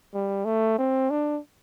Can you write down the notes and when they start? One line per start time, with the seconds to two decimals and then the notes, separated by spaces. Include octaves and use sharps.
0.14 G3
0.45 A3
0.78 C4
1.10 D4